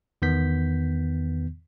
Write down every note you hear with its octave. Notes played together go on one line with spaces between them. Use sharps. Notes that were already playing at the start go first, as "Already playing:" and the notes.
E2 D#3 B3 G6 B6